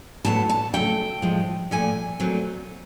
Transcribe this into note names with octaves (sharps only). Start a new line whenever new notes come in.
A2 F#3 B3 A5
A5
C#3 F#3 A3 G5
A2 F3 G#3
A#2 F3 A3 G#5
A#2 F#3 A3 C4